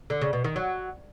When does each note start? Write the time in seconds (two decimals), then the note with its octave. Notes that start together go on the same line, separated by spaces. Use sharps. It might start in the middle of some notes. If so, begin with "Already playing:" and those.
0.10 D3
0.21 C#3
0.33 B2
0.44 D#3
0.56 F#3